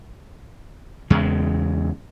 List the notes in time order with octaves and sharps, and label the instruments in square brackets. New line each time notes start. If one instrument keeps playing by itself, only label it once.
[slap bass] E2 C#3 G#3